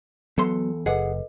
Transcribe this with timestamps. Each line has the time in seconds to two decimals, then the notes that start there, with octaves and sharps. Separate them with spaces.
0.38 E2 F#3 B3 A4 C6
0.86 F#1 G#4 A4 B4 D#5 F#5